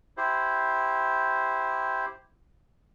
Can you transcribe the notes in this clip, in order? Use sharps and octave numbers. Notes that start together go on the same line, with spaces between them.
E4 G4 C5